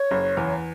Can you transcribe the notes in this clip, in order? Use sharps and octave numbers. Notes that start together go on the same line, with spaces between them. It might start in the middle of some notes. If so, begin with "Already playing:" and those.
Already playing: C#5
F#1
E2